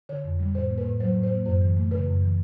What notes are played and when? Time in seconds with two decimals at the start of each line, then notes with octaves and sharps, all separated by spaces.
0.09 D3 C#5
0.24 F2
0.40 G3
0.55 A2 C5
0.70 A#3
0.78 B4
0.85 A2
1.00 F#3 C5
1.16 A2
1.23 C5
1.31 A#3
1.46 F#2 C5
1.61 E3
1.77 A3
1.91 C#3 B4
2.07 F#2
2.22 E3